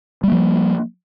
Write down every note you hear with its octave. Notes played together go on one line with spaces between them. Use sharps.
F3 G3 A#3